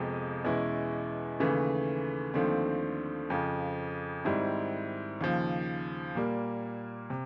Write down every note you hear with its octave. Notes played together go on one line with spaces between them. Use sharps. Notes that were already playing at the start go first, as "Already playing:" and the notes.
Already playing: F2 C3 F3 G#3 B3
E2 B2 G#3 C#4 E4
D#2 C#3 E3 A3
D#2 D3 F3 A3 C4
F2 C#3 F3
G#2 D#3 G3 C4 E4
D#2 C#3 F3
A#2 G3 A#3
C3